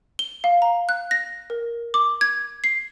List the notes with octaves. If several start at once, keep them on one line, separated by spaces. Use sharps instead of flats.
G7
F5
A#5
F#6
A#6
A#4
D6
G#6
C7